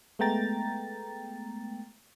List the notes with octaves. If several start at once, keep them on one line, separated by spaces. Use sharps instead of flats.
G#3 A3 B3 G5 A#5 A6